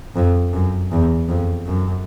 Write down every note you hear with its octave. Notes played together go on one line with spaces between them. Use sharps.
F2
F#2
E2
F2
F#2